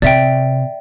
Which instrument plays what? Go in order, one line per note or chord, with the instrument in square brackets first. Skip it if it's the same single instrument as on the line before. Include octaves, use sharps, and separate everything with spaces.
[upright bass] C3 [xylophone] D5 E5 G5